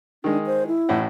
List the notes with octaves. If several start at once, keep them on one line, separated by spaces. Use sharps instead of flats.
D#3 G#3 D4
C5
E4
A1 A2 F#5